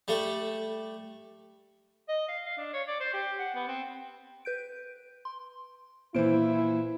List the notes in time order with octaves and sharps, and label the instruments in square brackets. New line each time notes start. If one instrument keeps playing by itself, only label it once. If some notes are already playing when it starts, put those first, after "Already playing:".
[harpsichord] G3 A3
[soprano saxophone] D#5
F5
F5
D4
C#5
D5
C5
G4
F#5
B3
C4
[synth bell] B4 G6 D7
C6
[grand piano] A#2 E3 [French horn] E4 [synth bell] C5 D7